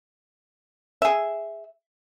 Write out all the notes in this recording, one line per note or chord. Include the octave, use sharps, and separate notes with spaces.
G#4 E5